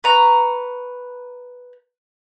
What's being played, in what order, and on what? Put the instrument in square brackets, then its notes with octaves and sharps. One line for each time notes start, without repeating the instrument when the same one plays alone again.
[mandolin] B4 A#5 C#6